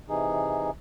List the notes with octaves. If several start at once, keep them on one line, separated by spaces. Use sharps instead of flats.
C3 E3 D#4 G#4